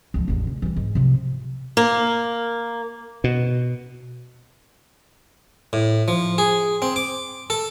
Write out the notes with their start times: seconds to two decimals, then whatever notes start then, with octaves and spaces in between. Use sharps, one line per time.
0.14 C#2 F3
0.28 A1 E2
0.47 C#3
0.62 E3 G3
0.76 G#2
0.95 C3 F3
1.77 A#3
3.24 B2
5.73 A2
6.08 F3
6.38 G#4
6.82 C4
6.96 D6
7.50 A4